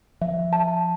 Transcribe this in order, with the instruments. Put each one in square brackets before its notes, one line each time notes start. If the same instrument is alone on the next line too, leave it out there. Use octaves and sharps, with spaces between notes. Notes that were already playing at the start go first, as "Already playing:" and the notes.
[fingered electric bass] F3 [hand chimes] E5
[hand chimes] A5